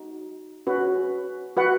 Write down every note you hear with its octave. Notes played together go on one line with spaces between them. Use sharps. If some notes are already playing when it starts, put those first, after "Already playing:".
Already playing: D#4 F#4
C#4 F#4 B4
F#4 B4 F#5